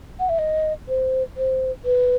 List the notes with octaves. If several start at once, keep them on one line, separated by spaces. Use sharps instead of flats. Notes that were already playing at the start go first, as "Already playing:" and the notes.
F#5
E5
D#5
C5
C5
B4